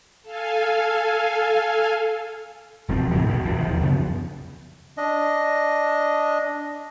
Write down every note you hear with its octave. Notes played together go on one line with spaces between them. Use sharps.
A4 F5 G#5
E1 F3 C4
G#2 B2 F3 G3
A#1 B2 D3
A#1 E2 C3 E3
D#2 D#3 F3
F#2 C#3 F3 B3
D4 D#5